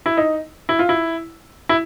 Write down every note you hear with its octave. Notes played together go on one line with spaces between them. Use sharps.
E4
D#4
E4
F4
E4
E4